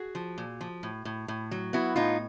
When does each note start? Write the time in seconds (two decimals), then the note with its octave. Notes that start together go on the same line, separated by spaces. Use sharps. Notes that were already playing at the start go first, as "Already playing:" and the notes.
Already playing: F#4 G#4
0.15 F3
0.38 A#2
0.61 F3
0.83 A2
1.05 A2
1.28 A2
1.51 F#3
1.73 B3 E4 F#4
1.96 A2 D#4 F4